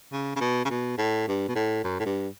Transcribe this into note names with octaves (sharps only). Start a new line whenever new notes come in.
C#3
C#3
B2
C#3
B2
A2
G2
B2
A2
F#2
A2
G2